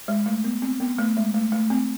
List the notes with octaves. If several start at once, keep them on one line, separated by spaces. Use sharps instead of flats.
G#3
A3
B3
C4
B3
A3
G#3
A3
A3
C4